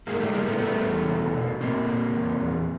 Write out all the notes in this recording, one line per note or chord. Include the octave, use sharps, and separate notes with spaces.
A2 G#3 A#3
G3 A3
A2 G#3 A#3
A3 B3
G3 A3 B3
E2
B2
B2
A#2 A#3 C4
A#2
E2
E2